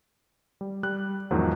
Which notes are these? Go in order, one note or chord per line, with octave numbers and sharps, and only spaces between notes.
G3
G3 F#6
E2 G#2 D#3 F3 F#3